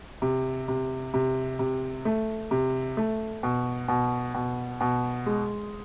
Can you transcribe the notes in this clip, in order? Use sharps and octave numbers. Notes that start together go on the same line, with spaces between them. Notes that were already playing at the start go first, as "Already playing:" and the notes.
C3
C3
C3
C3
A3
C3
A3
B2
B2
B2
B2
G#3